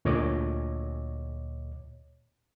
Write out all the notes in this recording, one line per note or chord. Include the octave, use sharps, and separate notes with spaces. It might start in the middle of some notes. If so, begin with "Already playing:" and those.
D2 A#2 C#5 D#5 D6